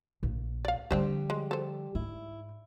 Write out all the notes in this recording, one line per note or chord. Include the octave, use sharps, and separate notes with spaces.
A#1
D5 F5
D3 F3 G3 C4 D4 G4 C5
G#3
A4 C5
G#2 E4